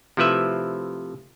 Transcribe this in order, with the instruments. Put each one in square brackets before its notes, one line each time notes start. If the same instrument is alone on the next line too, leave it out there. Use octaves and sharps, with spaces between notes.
[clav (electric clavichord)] C3 F3 A3 E4 B4 E5